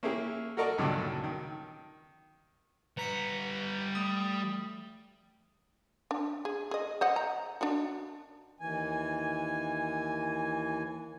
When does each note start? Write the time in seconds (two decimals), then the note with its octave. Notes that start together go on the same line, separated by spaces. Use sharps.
0.03 A#3 C#4 E4 G4 G#4
0.57 F#4 A4 A#4 D5 D#5 C#6
0.78 C#2 G2 A#2 D3 D#3 F#3
1.24 D#3
2.97 G3 B4 A#5 B6 C#7
3.95 A3 D#6
6.11 D4
6.45 G#4
6.71 G#4 D#5
7.01 C5 D#5 F#5
7.16 A#5
7.61 D4 D#4 F#4
8.60 D#2 E3 G#5